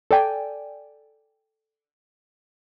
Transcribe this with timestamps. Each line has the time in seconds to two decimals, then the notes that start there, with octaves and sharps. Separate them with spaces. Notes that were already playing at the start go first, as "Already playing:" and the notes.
0.11 A4 D5 G5 G#5